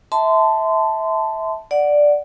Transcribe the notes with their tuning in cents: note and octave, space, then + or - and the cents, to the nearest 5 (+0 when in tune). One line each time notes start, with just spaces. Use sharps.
E5 -20 A5 +0 C6 -25
D5 +0 F#5 +0